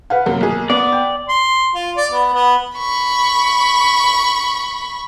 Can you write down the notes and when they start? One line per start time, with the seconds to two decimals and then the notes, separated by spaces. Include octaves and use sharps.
0.10 B4 F5 F#5
0.26 F#2 C3 A#3
0.41 B1 G#4
0.70 B3 D5
0.92 G5
1.29 C6
1.75 F4
1.97 D5
2.12 B3
2.34 B3
2.77 B5 C#6